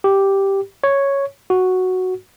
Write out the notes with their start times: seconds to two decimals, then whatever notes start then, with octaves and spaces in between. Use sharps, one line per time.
0.04 G4
0.84 C#5
1.50 F#4